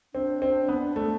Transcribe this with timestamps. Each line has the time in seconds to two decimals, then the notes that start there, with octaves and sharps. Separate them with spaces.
0.14 C4 D4
0.42 C4
0.69 B3
0.96 A3